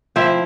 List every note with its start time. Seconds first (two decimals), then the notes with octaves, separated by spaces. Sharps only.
0.16 F3 C4 E4 E5